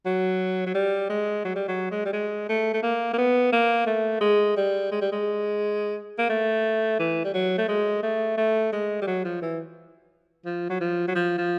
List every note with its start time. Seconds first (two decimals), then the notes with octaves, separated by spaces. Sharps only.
0.06 F#3
0.67 F#3
0.75 G3
1.10 G#3
1.45 F#3
1.56 G3
1.68 F#3
1.91 G#3
2.05 G3
2.13 G#3
2.49 A3
2.73 A3
2.83 A#3
3.13 A#3
3.18 B3
3.52 A#3
3.86 A3
4.21 G#3
4.57 G3
4.91 G#3
5.01 G3
5.12 G#3
6.18 A#3
6.30 A3
6.99 E3
7.24 G3
7.34 F#3
7.58 A3
7.68 G#3
8.03 A3
8.37 A3
8.72 G#3
9.02 G3
9.07 F#3
9.24 F3
9.42 E3
10.45 F3
10.69 F#3
10.80 F3
11.08 F#3
11.15 F3
11.38 F3